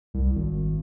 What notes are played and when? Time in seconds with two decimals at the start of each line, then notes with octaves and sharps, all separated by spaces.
0.14 C2
0.36 G#1